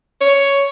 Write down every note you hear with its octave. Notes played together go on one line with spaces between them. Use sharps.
C#5